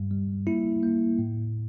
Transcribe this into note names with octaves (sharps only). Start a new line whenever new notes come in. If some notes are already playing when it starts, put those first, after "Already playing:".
Already playing: G2 G3
G3
A#3 E4
A#3
A2